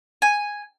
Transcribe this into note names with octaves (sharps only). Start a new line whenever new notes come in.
G#5